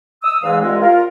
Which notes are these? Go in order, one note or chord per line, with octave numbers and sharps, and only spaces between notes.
D#6 E6
E2 G#2 E3 G#3 F5 E6
C2 G#3 C4 F4
F4 A#4